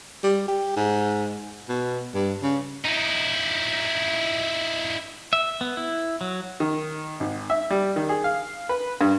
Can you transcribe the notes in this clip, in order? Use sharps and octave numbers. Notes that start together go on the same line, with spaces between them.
G3
G4
G#2
B2
G2
C#3
D#4 E4
E5
B3
E4
F#3
D#3
G#1
E5
G3
D#3
G#4
F5
B4
G2